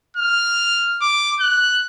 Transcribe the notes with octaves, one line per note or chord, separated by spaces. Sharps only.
F6
D6
F#6